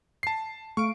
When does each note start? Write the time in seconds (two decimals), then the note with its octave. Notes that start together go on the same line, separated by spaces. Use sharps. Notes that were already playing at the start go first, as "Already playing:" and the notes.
0.23 A5 C7
0.77 A3 F5 C#6 D7